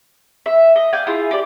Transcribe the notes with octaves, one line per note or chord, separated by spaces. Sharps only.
E5
D#5
D5 F5 G5 G#5
E4 F4 G#4
G4 D5